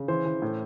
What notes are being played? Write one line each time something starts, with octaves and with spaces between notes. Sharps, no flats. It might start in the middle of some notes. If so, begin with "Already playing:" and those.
Already playing: C#3
E3 C5
E3
A2